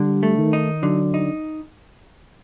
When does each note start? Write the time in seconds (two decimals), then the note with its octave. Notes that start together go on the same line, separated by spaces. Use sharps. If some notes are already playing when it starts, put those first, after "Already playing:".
Already playing: D3 G3
0.23 A3
0.38 D#3
0.53 D#4
0.83 D3 F#3
1.14 D#4